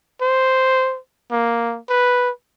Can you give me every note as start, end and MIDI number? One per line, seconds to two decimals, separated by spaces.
0.21 0.98 72
1.31 1.78 58
1.89 2.30 71